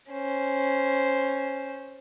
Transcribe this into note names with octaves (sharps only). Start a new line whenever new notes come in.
C#4 C5